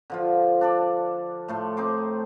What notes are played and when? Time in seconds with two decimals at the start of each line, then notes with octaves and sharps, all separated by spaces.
0.10 D3 F3 F4
0.61 D4 A4 D5
1.48 A2 A3 C6
1.77 C4 D#4 C6 D6